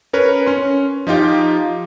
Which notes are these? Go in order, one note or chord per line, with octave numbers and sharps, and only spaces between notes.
C#4 A#4 B4 C#5
C#4 C6
F3 D#4 F4 G4